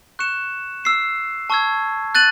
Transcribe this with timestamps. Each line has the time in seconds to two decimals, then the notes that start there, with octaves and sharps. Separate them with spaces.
0.19 C#6 F#6 C#7 E7
0.84 E6 C7 E7
1.50 A5 C#6 E6 G#6
2.15 F#6 A6 D#7 F#7